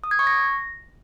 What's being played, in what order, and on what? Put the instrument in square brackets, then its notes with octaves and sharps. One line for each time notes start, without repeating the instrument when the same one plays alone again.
[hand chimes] D#6
G#6
C#6
A#6